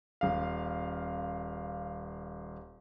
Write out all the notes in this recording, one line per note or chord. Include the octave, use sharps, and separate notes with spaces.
D#1 F5